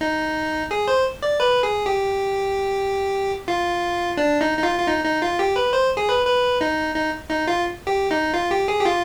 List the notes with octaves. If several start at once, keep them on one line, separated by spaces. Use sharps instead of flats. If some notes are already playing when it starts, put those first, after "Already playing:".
D#4
G#4
C5
D5
B4
G#4
G4
F4
D4
D#4
D#4
F4
F4
D#4
D#4
F4
G4
B4
C5
G#4
B4
B4
D#4
D#4
D#4
F4
G4
D#4
F4
G4
G#4
G4
F4